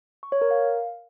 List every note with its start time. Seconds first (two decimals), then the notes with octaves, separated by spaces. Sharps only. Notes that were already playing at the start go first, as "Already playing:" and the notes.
0.23 C#6
0.32 C#5
0.41 A#4
0.51 F5